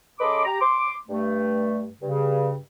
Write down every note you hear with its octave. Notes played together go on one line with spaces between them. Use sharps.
C#3 A4 D#5 B5 C6 D6
G4 A#5
C6 D6
G2 A3
G2 C#3